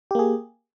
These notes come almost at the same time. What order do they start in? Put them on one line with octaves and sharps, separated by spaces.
G4 A#3 G#4